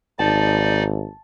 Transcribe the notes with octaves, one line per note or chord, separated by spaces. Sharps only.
G#1 D#4 D5 A5